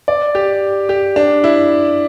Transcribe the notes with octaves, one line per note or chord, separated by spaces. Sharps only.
D5
G4
G4
D4
E4